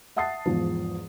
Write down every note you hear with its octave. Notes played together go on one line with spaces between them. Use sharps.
E5 F#5 A5 D#6 A6 C7
E2 G#2 F3